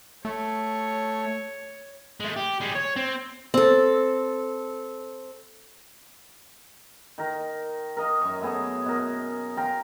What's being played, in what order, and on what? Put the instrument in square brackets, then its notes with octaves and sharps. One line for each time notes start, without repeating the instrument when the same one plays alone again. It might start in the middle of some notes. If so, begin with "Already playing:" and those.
[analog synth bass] A3 [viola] C#5
[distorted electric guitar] G#3 A3
G4
G3 G#4
C#5
C4
[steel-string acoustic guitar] C4 A4
[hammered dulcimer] D#3 A#4
A#4 D#5 F5
F#2 C#6
A3 B3 G#4 C#5
B2 A#4
F5 G5 A#5 C6